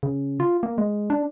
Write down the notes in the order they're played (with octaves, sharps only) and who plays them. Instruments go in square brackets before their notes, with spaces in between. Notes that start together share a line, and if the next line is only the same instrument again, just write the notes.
[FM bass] C#3
F4
A#3
G#3
D4